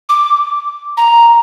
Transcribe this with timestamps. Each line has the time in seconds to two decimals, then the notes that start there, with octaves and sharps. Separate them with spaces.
0.09 D6
0.97 A#5